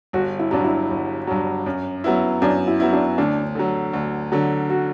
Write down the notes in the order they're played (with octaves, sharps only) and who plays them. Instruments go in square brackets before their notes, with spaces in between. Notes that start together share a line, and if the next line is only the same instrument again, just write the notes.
[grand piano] G1 [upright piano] F#4
[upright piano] E4
[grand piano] G2 F#3 [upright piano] D4
[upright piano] E4
[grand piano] G1
G2 F#3
F#2
F#3 B3 E4
[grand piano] F#2 [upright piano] D4
[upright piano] E4
[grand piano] F#3 B3 E4
[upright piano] D4
[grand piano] D2 [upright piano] D4
[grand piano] D3 F#3
D2
D3 F#3
[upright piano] F#4